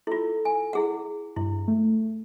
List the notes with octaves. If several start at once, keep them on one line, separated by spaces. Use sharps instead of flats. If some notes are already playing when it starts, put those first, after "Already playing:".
E4 F4 A4
G#5
E4 G#4 F#5
G2 E4
A3